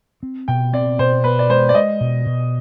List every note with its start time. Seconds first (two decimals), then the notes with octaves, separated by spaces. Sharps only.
0.23 C4
0.48 B2 G5
0.73 C4 D5
0.99 B2 C5
1.24 B2 B4
1.39 D5
1.50 G#3 C5
1.69 D5
1.74 G#3 D#5
2.01 B2
2.26 B2